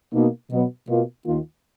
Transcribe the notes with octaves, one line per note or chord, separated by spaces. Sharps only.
B2 A#3 D#4
B2 F#3 B3
B2 A#3 F4
D#2 D#3 A#3 F4